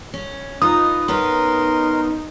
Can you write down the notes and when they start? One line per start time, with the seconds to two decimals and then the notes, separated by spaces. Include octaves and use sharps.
0.14 C#4
0.62 D#4 F4 B4 D#6
1.08 B3 C#4 A#4 B4 C6